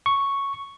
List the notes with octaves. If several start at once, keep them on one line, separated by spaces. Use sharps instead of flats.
C#6